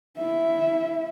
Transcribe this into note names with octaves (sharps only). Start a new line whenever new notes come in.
E4 E5